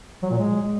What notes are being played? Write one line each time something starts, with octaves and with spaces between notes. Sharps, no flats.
F#3
A#2
G#3